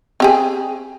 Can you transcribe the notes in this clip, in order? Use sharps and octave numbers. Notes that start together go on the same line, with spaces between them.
C4 G4 G#4